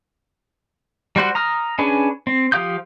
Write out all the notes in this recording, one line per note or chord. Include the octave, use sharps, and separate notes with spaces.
G3 F#4 C5 F#5
A#5 D#6 F6
C#4 D4 G#4 B4
C4
F3 G4 F5 D#6 G6